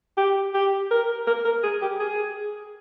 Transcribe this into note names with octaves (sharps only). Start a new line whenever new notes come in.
G4
G4
A#4
A#4
A#4
G#4
G4
G#4